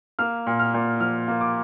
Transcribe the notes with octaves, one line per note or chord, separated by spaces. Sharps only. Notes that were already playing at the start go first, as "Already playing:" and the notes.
A#3 F6
A#2
F6
A#2
F3 F6
A#3
D6